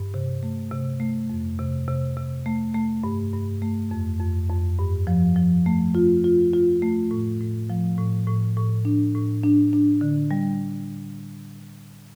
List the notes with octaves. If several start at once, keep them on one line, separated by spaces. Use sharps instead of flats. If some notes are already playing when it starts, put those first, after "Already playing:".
Already playing: G2
C3
A3
C3
A3
F2
C3
C3
C3
A3
A3
G2
G2
A3
F2
F2
F2
G2
F3
F3
A3
F4
F4
F4
A3
A2
A2
F3
A2
A2
A2
D4
A2
D4
D4
D3
G3